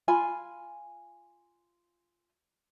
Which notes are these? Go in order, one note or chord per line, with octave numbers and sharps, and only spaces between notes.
F4 G#5 B5